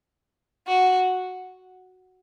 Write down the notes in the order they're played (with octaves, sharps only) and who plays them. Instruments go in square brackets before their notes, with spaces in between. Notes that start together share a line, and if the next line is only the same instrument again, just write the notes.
[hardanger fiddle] F#4